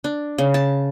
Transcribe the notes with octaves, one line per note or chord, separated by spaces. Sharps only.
D4
C#3
A5